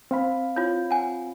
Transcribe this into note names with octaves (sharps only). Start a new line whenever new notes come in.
C4 F5 B5
F4 C#5
F#5 G#5